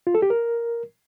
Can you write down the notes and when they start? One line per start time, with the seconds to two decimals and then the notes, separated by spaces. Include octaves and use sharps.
0.07 F4
0.15 A4
0.22 G4
0.30 A#4